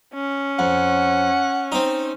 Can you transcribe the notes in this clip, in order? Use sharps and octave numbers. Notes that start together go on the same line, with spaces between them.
C#4
F2 F#5
C4 D#4